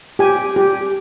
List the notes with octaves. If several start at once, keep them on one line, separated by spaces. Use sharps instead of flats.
G4 G#5
G4